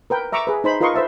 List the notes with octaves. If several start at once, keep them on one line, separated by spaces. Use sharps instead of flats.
A#4 B4 G5
E5 A#5 C#6 D6 E6
G#4 B4
D#4 C5 B5
F4 A#4 B4 D#5 C6 C#6
B4 C5 E5 A5